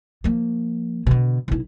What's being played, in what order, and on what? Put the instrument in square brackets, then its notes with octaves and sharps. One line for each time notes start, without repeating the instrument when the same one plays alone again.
[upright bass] F3 A#3
B2 D3
B1 E4